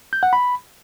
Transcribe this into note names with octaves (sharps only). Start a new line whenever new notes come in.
G6
F#5
B5